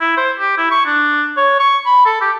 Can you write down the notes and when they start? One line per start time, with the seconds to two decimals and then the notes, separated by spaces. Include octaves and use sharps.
0.01 E4
0.17 C5
0.40 G4
0.57 E4
0.71 C#6
0.86 D4
1.37 C#5
1.60 C#6
1.86 B5
2.05 A4
2.21 G4